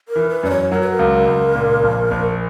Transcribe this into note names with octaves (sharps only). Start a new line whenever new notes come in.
A#4
E3
B4
F#2 D5
C#5
F#3 A#4
B4
A#4
C#2
C#2
A#2
A#1
A#1